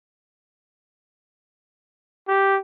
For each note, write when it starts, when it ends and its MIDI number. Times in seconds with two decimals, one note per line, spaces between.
2.28 2.57 67